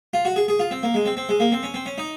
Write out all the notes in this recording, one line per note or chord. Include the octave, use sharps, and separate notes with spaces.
F4
F#4
G#4
G#4
F4
C4
A#3
G#3
C4
C4
G#3
A#3
C4
C#4
C4
C#4
D#4